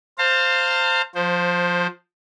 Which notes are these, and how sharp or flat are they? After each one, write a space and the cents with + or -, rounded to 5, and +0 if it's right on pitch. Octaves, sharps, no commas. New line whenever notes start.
C5 +0 F5 +0 A5 +45
F3 +20 C5 +0